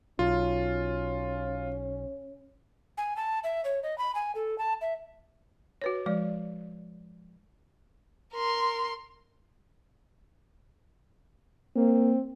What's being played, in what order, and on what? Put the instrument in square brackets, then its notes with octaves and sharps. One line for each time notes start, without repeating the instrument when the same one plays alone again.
[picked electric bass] B1 [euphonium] C#4 [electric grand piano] F4
[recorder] G#5
A5
E5
C#5
D#5
B5
G#5
A4
A5
E5
[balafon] F#4 B4 C#5
F3 G#3 D5
[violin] A#4 C6
[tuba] A#3 [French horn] C4